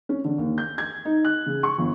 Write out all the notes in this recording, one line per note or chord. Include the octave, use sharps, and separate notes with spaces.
C#4
D3
D#2
G6
G#6
D#4
F#6
C#3
C#6
G1